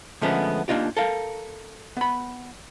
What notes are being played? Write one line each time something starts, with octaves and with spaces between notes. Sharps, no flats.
D3 F3 G#3 A3 B3 C#4
A#3 D4 D#4 F4 G4
A4 A#4 F5
B3 B5